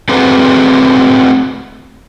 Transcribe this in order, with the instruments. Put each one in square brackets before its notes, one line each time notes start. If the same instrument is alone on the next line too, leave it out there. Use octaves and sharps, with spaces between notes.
[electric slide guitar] A3 C4 F#4 G#4 B4